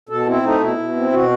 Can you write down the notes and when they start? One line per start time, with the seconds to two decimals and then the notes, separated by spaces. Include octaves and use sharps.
0.09 B2 A4
0.27 C4 E4
0.44 A3 D#4
0.60 B2 E4
0.78 B2
0.96 C4
1.12 B2 F#4